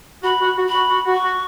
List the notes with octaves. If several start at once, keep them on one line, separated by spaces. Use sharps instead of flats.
F#4 B5
F#4
F#4
B5
F#4
F#4
F#4
C#6
F#4